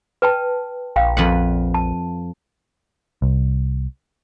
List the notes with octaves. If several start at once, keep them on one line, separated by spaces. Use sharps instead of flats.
B4 G5 A5
A#1 F5 G5
A#1 F2 B4 F#5
A5
C2